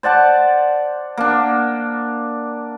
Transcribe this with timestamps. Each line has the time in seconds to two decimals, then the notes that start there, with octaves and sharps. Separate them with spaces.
0.03 C5 D5 F#5 A5
1.17 A#3 D4